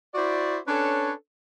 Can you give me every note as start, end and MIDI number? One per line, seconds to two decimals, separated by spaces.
0.15 0.57 64
0.15 0.57 66
0.15 0.57 72
0.15 0.57 74
0.67 1.12 61
0.67 1.12 62
0.67 1.12 69
0.67 1.12 71
0.67 1.12 73